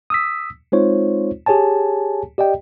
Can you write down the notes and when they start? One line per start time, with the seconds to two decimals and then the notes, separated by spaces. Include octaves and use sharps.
0.10 D#6 E6 B6
0.72 G#3 C4 D#4 F4 C5 C#5
1.46 G4 G#4 C#5 G#5 A5
2.38 G4 D5 D#5 G5